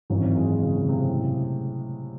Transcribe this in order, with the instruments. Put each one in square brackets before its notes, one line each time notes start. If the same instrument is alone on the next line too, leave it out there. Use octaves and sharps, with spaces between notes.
[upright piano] G#1 F#2 E3 C4 [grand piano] F#3
[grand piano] G#3
C#3
C3
A2